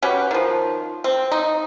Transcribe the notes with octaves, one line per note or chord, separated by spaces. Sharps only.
C#4 F#4 G4 B4
D#3 F3
C4
D#4